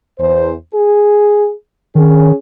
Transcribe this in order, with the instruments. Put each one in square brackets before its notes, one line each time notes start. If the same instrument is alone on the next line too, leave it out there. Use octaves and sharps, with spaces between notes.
[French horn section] E2 C5
G#4
[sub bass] D#3 [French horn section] C#4 G#4